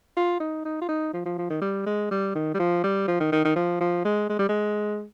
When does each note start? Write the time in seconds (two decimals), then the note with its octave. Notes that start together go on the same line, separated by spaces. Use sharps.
0.17 F4
0.40 D#4
0.65 D#4
0.81 F4
0.89 D#4
1.14 F3
1.26 F3
1.38 F3
1.50 D#3
1.62 G3
1.86 G#3
2.11 G3
2.35 D#3
2.54 G3
2.59 F3
2.84 G3
3.08 F3
3.20 D#3
3.33 D#3
3.45 D#3
3.56 F3
3.81 F3
4.05 G#3
4.29 G#3
4.39 G3
4.49 G#3